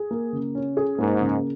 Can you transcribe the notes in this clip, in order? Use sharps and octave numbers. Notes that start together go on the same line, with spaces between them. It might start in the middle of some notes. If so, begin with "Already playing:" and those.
Already playing: G#4
A#3
C#3
C#4
G#4
G#2 A#3
C#3